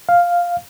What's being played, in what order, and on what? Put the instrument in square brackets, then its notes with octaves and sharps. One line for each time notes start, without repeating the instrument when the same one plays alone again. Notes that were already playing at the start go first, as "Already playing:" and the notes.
[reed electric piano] F5